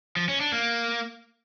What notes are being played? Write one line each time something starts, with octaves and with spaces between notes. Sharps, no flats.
F3
C#4
D4
A#3